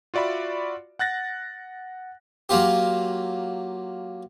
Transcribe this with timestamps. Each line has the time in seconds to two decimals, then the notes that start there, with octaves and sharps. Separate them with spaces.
0.14 F4 F#4 D5 E5 B5
0.99 F#5 F#6 A6 A#6
2.49 F#3 A#3 F4 G4